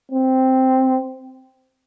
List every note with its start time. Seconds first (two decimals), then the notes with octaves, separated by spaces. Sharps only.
0.12 C4